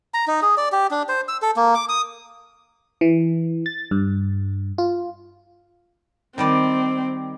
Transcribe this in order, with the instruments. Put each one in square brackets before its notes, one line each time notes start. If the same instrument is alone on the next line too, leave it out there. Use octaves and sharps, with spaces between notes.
[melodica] A#5
D#4
G#4
D5
G4
D4
C5
E6
A4
A#3
D6
D#6
[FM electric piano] E3
A6
G2
F4
[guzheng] D#3 G3 D5 [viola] C4